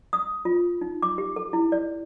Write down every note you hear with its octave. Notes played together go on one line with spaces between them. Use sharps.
D#6
F4
D#4
D6
G4
A4
E4
D5